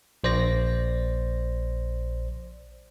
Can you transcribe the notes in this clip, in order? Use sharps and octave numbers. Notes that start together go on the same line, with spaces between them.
A#1 C5 D5 A#6